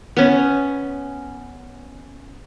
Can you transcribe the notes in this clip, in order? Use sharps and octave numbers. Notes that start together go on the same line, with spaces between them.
B3 C#4